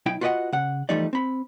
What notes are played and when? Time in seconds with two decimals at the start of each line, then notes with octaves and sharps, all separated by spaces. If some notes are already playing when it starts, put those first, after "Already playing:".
0.06 B1 E4 G5
0.21 F4 F#4 B4 D5 D#5 F#5
0.53 C#3 F#5
0.89 E3 F3 G3 A3 D#4 D5
1.13 C4 B5